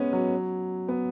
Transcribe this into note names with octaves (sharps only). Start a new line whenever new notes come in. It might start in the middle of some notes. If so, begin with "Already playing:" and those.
Already playing: G#3 B3 C#4
F#3
B3